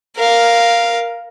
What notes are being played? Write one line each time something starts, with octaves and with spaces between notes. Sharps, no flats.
A#4 F5